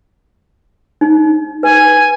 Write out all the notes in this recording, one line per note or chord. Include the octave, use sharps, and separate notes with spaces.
D#4
B4 G#5